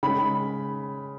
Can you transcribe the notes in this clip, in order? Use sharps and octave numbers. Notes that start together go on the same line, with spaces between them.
C#3 G#3 B5